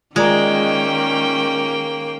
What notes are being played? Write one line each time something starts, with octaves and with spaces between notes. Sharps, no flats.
D#3 G#3 A#3 C#4 F4 D5 G5 A#5